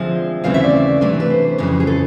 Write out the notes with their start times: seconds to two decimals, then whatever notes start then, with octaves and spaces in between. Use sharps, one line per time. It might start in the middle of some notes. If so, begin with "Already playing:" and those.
Already playing: D3 F3 G#3 C4 E5
0.44 D#2 C#3 E3 A3 C4 F5
0.54 E5
0.64 D5
1.01 C3 E3 A3 D4
1.20 B4
1.30 C5
1.58 F2 C#3 E3
1.80 G#4
1.87 A4